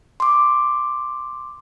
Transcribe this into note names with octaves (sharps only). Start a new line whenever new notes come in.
C6 D6